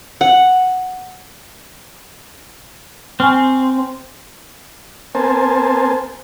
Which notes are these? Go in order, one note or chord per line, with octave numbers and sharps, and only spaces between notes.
F#5
C4 G#5 C#6 F6
B3 C4 A#4 C5 G#5 A5